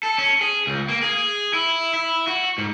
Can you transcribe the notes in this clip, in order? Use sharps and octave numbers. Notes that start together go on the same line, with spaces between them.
A4
C#4
G#4
C#2
A#3
G#4
E4
E4
F#4
G#2